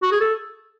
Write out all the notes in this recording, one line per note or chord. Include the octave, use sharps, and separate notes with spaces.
F#4
G#4
A4